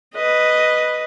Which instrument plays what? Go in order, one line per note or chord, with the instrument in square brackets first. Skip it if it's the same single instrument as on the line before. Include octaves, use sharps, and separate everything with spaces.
[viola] B4 D#5